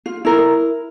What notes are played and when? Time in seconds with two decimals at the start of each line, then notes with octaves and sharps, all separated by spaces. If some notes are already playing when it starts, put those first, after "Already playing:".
0.06 F4
0.25 E4 A#4